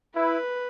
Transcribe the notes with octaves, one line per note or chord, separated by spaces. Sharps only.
E4 B4